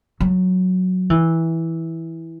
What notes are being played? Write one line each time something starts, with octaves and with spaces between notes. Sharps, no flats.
F#3
E3